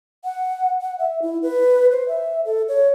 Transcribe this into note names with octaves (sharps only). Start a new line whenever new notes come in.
F#5
F#5
E5
E4
B4
C5
E5
A4
C#5